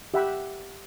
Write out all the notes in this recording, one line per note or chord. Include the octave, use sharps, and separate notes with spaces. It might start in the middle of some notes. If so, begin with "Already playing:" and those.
G4 E5 F#5 G5 B5